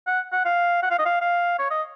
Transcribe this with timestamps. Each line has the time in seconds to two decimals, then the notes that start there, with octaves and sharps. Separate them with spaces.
0.07 F#5
0.33 F#5
0.45 F5
0.83 F#5
0.91 F5
0.99 D#5
1.05 F5
1.21 F5
1.59 C#5
1.71 D#5